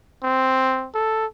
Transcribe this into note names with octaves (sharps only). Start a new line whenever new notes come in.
C4
A4